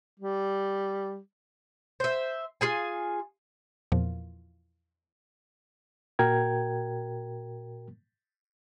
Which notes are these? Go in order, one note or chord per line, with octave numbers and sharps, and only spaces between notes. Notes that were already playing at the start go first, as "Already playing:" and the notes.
G3
C5 E5
F4 G#4 G#5
E2 A#2 F3
A#2 F#4 A#4 G5 G#6